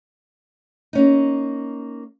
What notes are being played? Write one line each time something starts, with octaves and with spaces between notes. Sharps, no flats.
A#3 C#4 D#4